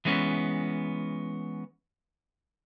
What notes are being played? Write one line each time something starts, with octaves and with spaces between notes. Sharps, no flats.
E3 G#3 B3 C#4